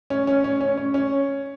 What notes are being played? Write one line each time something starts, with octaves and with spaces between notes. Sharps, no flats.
C#4
C#4
C#4
C#4
C#4
C#4